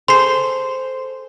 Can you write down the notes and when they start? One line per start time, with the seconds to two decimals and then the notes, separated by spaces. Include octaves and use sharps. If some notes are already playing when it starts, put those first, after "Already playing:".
0.08 G#4 A4 C5 C6 C7